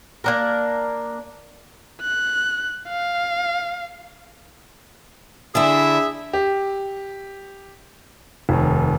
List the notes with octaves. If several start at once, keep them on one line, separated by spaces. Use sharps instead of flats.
A#3 D4 A#4
F#6
F5
D3 D4 E4 G#4 E5
G4
F1 D#2